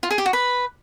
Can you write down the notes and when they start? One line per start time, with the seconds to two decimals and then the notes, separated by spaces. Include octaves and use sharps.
0.03 F4
0.11 G#4
0.18 G4
0.26 F#4
0.33 B4